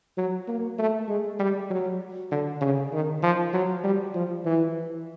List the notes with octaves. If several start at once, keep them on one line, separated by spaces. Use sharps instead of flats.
F#3
A#3
A3
G#3
G3
F#3
D3
C#3
D#3
F3
F#3
G3
F3
E3